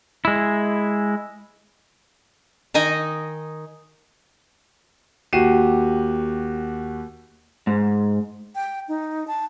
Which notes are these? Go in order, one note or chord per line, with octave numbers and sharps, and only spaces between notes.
G#3 E4
D#3 D#4 D#5 G#5
D#2 F#4 G4 C7 D#7 E7
G#2
G5
D#4
A5